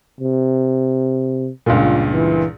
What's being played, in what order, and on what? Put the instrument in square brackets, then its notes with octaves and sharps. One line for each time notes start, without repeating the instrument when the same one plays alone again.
[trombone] C3
[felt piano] C#2 G2 A#2
[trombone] E3